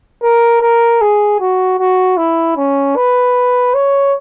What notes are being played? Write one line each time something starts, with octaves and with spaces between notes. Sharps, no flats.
A#4
A#4
G#4
F#4
F#4
E4
C#4
B4
C#5